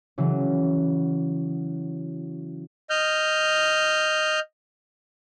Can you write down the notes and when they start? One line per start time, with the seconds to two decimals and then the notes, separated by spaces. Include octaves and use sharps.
0.18 C#3 E3 F#3
2.90 D#5 F6 G6